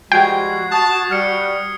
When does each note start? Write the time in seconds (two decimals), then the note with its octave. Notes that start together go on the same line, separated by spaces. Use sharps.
0.12 F3 G3 G#3 F#4 G5 G#6 C7
0.72 A5 D#6
1.11 G3 F6 C#7